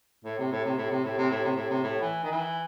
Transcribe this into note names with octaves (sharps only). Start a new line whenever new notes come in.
A2
C3
A2
C3
A2
C3
A2
C3
A2
C3
A2
C3
A2
E3
D#3
E3